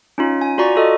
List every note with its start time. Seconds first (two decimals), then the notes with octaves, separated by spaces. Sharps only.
0.18 C#4 D#4 F4
0.41 G#5
0.58 F4 F#4 D5 A#5 C#6
0.76 F4 A4 D#5